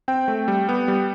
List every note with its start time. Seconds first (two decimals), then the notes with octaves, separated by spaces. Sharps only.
0.08 C4 G5
0.28 A3
0.48 G3
0.69 B3
0.88 G3